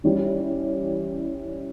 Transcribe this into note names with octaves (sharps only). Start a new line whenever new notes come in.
E3 G3 C#4 E4 G4